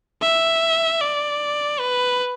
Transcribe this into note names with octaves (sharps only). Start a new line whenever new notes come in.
E5
D5
B4